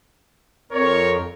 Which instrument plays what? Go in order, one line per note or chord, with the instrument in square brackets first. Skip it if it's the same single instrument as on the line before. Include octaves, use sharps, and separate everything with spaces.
[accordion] F2 [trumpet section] A#4 C#5